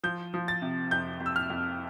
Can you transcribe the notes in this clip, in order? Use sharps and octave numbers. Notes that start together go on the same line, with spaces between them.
F3 G6
F3
A6
C3
F2 G6
F2
E6
F6
F2